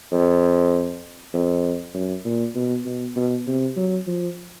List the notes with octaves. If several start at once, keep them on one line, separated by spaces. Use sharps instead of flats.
F2
F2
F#2
A#2
B2
B2
B2
C3
F#3
F3